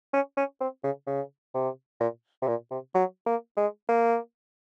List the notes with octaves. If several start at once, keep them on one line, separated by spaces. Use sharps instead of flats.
C#4
C#4
C4
C#3
C#3
C3
A#2
C3
A#2
C3
F#3
A#3
G#3
A#3